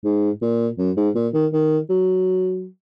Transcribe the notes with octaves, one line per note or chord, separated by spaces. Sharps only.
G#2
A#2
F#2
G#2
A#2
D#3
D#3
F#3